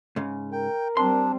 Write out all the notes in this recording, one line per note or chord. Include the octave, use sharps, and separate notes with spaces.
G#2 C#3
A#4 G5
G3 C4 D4 C6